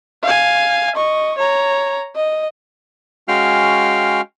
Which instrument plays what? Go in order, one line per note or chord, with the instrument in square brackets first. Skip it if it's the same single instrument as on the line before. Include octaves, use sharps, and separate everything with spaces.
[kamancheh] F5 G#5
D#5 C#6
C#5 A#5
D#5
[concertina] G#3 C#4 F#4 F5 G5 F6